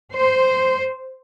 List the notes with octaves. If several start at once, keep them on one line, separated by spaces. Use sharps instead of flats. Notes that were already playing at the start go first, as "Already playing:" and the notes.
C5